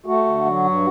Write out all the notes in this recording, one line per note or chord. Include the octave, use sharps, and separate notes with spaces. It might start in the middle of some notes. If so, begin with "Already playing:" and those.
A3 F#4
D3
F#3
G2